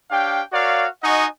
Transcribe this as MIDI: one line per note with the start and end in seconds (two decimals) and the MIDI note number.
0.11 0.41 62
0.11 0.41 67
0.11 0.41 73
0.11 0.41 77
0.11 0.41 79
0.52 0.87 66
0.52 0.87 70
0.52 0.87 73
0.52 0.87 74
0.52 0.87 77
1.03 1.26 63
1.03 1.26 66
1.03 1.26 75
1.03 1.26 78
1.03 1.26 80
1.03 1.26 85